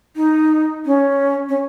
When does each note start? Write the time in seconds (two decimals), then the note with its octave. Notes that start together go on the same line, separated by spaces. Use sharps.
0.16 D#4
0.86 C#4
1.49 C#4